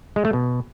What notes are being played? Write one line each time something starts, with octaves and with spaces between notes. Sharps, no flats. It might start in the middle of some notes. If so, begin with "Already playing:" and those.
G#3
A3
B2